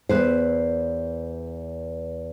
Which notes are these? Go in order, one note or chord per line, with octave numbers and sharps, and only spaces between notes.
E2 B4 C5